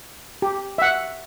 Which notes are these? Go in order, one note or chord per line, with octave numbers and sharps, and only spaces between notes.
G4
E5 F#5